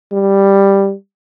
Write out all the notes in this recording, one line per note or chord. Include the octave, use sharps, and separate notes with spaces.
G3